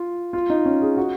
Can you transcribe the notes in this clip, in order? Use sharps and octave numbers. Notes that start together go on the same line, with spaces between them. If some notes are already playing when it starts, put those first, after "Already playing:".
Already playing: F4
F4
D#4
C#4
G#4
F#4